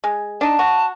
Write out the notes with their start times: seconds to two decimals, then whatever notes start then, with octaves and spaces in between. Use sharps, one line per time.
0.04 G#3
0.41 D4 D#4 A5
0.59 F#4